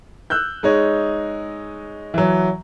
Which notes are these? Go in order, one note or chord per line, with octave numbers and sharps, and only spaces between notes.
E6 F#6 G6
G#3 D#4 C#5 D#5
E3 F#3